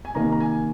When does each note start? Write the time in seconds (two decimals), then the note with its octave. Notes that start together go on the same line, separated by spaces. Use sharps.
0.05 G#5
0.15 C3 D#3 A#3 A#5
0.32 A#5
0.40 G#5